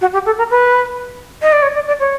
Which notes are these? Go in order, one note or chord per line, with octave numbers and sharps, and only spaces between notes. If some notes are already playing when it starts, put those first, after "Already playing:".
F#4
G4
A4
A#4
B4
D#5
D5
C#5
D5
D5
C#5